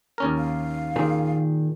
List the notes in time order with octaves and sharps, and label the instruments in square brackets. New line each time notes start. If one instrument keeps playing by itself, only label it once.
[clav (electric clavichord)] D#2 C#4 A#4
[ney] F5
[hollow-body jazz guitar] A#2 D#3 G#4